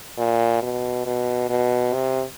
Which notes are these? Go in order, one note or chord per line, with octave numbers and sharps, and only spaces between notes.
A#2
B2
B2
B2
C3